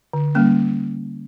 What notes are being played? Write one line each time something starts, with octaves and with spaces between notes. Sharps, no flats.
D3
G3 A#3 C#4